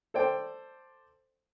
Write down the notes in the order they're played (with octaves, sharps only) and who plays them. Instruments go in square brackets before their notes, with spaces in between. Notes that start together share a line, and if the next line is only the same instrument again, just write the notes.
[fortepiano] A4 C5 D5 G5